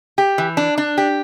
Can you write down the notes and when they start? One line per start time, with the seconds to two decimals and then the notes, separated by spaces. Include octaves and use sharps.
0.18 G4
0.38 E3
0.57 D4
0.78 D4
0.98 G4